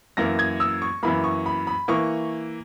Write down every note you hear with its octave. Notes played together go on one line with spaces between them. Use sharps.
F#2 E3 A#3 A#6
G#6
E6
C#6
F#2 E3 A#3 B5
C#6
B5
B5
E3 A#3 C#6